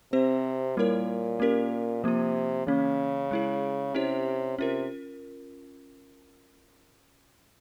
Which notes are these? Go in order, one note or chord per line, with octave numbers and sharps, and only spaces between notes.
C3 C4 G4 C5
A#2 G3 A#3 E4 A#4 C#5
A#3 C#4 G4 A#4
C3 F3 A#3 F4
C#3 E3 A#3 C#4
G#3 E4 G#4
C3 C#4 E4 G4 C#5
C3 C#4 F4 A#4